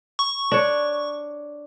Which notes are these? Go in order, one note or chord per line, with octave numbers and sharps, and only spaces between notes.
C#6
D4 C#5